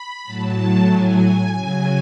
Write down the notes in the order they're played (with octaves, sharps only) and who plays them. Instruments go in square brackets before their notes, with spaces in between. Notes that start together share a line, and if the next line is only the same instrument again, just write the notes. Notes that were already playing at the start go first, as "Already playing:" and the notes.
Already playing: [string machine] B5
A2 F#3 A5
G#5
C#3 F#3